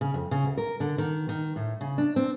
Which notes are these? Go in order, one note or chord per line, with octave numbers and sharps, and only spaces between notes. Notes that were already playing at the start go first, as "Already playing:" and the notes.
C#3
F2
C#3
D2
A#4
D3
D#3
D#3
A2
C#3
D4
C4